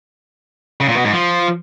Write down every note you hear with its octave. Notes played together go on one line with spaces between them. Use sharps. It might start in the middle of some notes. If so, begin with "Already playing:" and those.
C#3
A#2
B2
G#2
F3